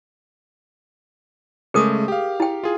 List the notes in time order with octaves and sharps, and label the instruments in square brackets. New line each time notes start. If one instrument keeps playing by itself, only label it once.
[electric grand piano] C#3 G#3 A3 [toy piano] G#4 A#4 D#6
[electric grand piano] G4 F5
[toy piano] E4 G5
[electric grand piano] F4 G#4